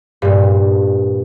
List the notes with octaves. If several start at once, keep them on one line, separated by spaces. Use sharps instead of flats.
G2 A#2